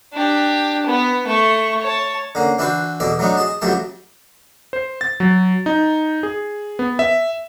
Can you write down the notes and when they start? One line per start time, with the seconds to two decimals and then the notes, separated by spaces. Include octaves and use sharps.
0.14 D4 G4
0.86 B3
1.27 A3 C#6
1.82 C#5 A5
2.35 D3 A#3 C#4
2.59 E3 D4 E4 F#4 B4 C5
3.00 E2 B2 A4 D5
3.19 F#3 A3 B3 D4 D#4
3.37 G#4 D#5 A5
3.62 F2 C#3 F#3 A3 G4 A5
4.73 C5
5.01 A6
5.20 F#3
5.66 D#4
6.23 G#4
6.79 B3
6.99 E5